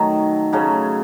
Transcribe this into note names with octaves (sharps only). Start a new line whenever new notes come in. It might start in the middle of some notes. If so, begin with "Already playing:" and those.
Already playing: D#3 F#3 A3
C#3 F#3 A3 C#4